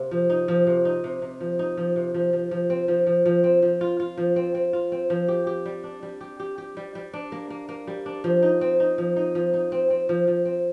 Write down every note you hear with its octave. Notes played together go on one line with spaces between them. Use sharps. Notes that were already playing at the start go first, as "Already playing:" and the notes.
Already playing: C3 A#3
F3
D#4
F3
C3
D#4
C3
C3
F3
D#4
F3
C3
F3
F3
F3
C4
F3
F3
F3
C4
F3
F4
F4
F3
C4
C4
F4
C4
F3
G4
G4
G3
D4
G3
G4
G4
G4
G3
G3
D4
A#3
A#3
A#3
G3
D4
F3
D#4
C4
D#4
F3
D#4
F3
D#4
C4
C4
F3
F3
C4